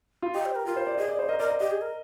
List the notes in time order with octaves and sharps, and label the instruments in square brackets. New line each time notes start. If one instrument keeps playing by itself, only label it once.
[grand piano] F4
[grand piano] G4 [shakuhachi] D#5
[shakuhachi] C5
A#4
[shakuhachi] F4 [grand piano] A#4
[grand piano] C5
D5
[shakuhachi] G#4 [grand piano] D#5
[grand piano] D5
C5
[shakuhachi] A#4 [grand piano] D#5
[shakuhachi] A#4 [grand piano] D5
[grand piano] D#5
[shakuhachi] G4 [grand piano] D#5
[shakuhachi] G#4
A#4